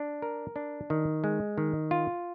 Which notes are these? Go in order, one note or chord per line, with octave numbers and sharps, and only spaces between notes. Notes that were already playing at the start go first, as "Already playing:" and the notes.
Already playing: D4
A#4
D4
D#3
G#3
D#3
F4